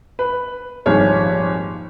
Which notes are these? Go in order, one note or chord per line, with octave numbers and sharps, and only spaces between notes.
B4
D#1 G#1 F3 G#4 C#5 F6